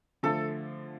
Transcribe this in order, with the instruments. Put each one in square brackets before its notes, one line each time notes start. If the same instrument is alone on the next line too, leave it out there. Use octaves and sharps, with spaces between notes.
[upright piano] D3 F3 A3 [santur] A4